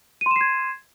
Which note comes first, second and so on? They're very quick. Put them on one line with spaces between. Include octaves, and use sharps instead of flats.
D#7 C6 E7 C7 G#6